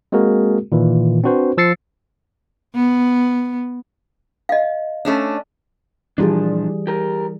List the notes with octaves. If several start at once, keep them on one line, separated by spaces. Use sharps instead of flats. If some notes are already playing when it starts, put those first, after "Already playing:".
G#3 A#3 C4 F#4 G#4 A#4
A#2 D#3 E3
C4 D4 F#4 B4 C5
F3 E6 A6 C7 C#7
B3
D#5 F5
A3 C#4 D4
A#2 E3 F3 G3 D4 G#4
G4 A#4